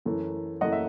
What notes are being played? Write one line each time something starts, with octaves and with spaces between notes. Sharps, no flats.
F#2 E3 A3
F#2 E3 A3 D#5 F#5
E5